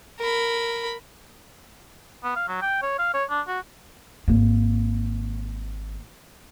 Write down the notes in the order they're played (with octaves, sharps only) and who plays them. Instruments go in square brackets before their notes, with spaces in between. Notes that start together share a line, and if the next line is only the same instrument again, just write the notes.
[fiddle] A#4 B5
[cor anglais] B3
F5
F#3
G5
C#5
F5
C#5
D4
F#4
[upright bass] G#1 A#3